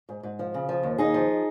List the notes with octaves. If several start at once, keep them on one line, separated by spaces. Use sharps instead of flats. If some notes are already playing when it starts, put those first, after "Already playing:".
G#2
G#2
F3
C#3
F3
D#2
D#2 D#4 G#4
F3